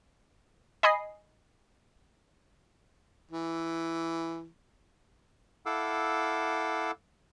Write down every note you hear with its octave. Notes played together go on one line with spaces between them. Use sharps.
D#5 G#5 B5 D#6 C7
E3
E4 A4 F5 F#5 D6 E6